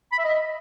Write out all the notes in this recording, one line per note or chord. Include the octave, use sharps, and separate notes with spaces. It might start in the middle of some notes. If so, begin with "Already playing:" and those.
B5
E5
D#5